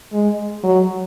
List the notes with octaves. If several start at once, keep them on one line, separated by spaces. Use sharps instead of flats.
G#3
F#3